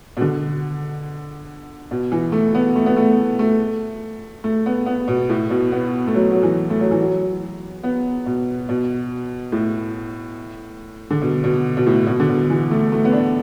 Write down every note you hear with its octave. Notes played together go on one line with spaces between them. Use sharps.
B2
D3
B2
E3
A3
B3
A3
B3
A3
A3
A3
B3
B3
B2
A2
B2
B3
A3
F#3
F#3
E3
A3
F#3
E3
F#3
B3
B2
B2
A2
D3
B2
B2
B2
A2
B2
D3
B2
E3
A3
A3
B3
D4